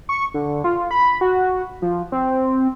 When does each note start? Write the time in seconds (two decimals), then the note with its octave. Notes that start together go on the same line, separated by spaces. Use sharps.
0.09 C#6
0.34 D3
0.64 F4
0.91 B5
1.21 F#4
1.82 F3
2.12 C4